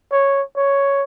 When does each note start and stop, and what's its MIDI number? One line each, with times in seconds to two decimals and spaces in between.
0.12 0.43 73
0.57 1.04 73